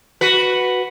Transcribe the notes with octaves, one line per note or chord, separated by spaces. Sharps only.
F#4 B4